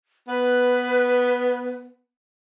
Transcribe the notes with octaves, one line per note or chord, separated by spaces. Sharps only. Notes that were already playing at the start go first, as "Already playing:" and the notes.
B3 B4